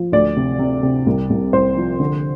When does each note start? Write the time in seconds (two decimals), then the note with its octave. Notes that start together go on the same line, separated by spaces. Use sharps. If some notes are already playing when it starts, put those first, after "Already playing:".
Already playing: F3
0.12 D2 D5
0.36 C3
0.59 C3
0.83 C3
1.06 C2
1.30 C2
1.53 C2 C5
1.77 F3
2.00 D3